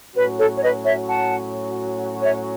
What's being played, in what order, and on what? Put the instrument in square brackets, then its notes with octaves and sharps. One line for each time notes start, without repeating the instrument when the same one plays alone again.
[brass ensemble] A2 F#3 C#4 F#4 [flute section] B4
[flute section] A4 C#5
C#5
B4 D#5
C#5 E5
F#5 A5
C#5 E5